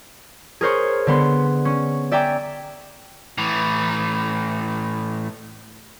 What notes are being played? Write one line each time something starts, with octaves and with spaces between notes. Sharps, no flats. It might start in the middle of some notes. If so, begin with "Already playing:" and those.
G#4 A#4 C5 C#5
D3 B3 C6
C#4
D5 E5 G5 G#5 A#5 D6
A2 E3